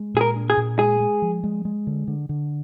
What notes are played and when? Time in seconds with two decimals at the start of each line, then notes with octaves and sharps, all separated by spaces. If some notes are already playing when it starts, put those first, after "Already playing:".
Already playing: G#3
0.14 A#2 G#4
0.21 A#4
0.35 D4
0.50 G#4
0.57 A#2
0.79 G#3 G#4
1.00 G#3
1.22 F3
1.44 G#3
1.65 G#3
1.87 D3
2.08 D3
2.29 D3